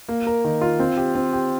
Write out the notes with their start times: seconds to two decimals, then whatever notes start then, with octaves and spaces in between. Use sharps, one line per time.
0.09 A#3
0.27 A#4
0.45 D#3
0.62 F4
0.80 C4
0.97 G4
1.15 C4
1.33 G4